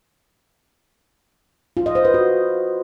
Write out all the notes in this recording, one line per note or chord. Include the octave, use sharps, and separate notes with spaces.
F4
D#5
C5
B4
F#4